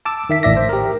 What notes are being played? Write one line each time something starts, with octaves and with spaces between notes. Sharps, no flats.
A5 D6 E6
D#3 E5 B6
A1 A2 D5 E5 D6 A#6
C5
G4 A#4